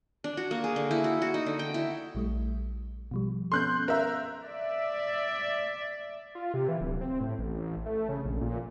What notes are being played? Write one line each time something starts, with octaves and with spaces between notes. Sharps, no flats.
D4
F#4
A#3
G#4
D3
E4
F#4
F#4
D#4
D3
G5
E4
A#1 G3 A3
B2 F3 G3
B3 C#4 A4 C6 F#6 G6
A#4 E5 F5
D5 E5
F4
C3
E3
D1
C4
A2
A1
A3
C#3
A#1
A#2